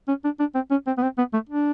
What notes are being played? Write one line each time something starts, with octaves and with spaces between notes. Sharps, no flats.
C#4
D4
D4
C4
C#4
C4
B3
C4
B3
A3
D4